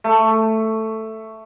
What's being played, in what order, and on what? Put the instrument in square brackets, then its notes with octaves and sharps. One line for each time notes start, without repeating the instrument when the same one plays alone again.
[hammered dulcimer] A3